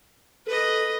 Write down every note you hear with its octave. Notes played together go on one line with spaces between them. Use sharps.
A4 B4 D#5